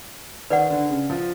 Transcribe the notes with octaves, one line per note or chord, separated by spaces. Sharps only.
D#3 B4 D5 F#5
D3
C#3
F3